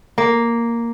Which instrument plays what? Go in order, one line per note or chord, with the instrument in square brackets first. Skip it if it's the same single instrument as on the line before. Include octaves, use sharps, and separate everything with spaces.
[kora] A#3